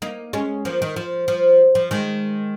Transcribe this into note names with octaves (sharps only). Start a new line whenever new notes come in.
A#3 D#4
G#3 C#4
F3 A#3
D#3
F3
F3
F3
D#3 G#3